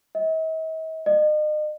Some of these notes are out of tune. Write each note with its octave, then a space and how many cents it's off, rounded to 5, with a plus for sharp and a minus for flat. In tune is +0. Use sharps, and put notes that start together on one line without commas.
D#5 +45
D#5 -40